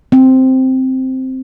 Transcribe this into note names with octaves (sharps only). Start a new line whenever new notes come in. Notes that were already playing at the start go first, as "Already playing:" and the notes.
C4